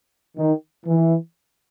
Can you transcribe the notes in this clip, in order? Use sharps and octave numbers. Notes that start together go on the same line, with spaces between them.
D#3
E3